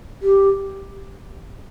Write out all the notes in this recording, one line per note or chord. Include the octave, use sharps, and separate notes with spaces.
G4